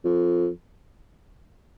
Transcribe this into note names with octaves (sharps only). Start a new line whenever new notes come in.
F2